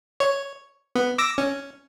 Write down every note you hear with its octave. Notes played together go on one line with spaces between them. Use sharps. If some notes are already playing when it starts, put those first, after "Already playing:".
C#5
B3
D6 E6 A#6
C#4